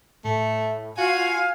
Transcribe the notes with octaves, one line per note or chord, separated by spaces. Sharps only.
A2 A3
F4 F#4 F5 G#5